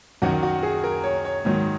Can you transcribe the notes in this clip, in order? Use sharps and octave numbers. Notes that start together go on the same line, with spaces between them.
F#2 D#3 F#3 F#4
F#4
G#4
A#4
C#5
C#5
G#2 D#3 F#3